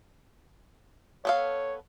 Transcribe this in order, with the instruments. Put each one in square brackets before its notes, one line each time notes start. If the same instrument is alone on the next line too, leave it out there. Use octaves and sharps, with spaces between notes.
[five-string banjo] B3 A4 F5 [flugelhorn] C#5